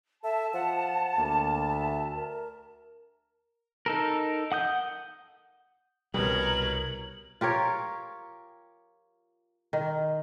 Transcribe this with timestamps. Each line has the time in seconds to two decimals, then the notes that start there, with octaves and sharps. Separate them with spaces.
0.24 A4 E5 A5
0.54 F3 F#5
1.17 D2 A#3
1.70 E5
2.16 A#4
3.86 D#4 A4 A#4
4.52 F#5 D#6 G6
6.14 C2 B2 G3 A#4 C#5 F#7
7.41 F4 G4 A#4 C#5
9.73 D#3